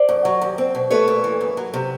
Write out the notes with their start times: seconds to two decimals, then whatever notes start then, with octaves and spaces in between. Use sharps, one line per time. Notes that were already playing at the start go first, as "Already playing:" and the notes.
Already playing: C5 D5
0.09 F#2
0.25 F#3
0.42 D#2
0.58 C4
0.75 B2
0.91 A3 B4 C#5
1.08 A#2
1.24 E3
1.41 F#2
1.57 F#3
1.74 C3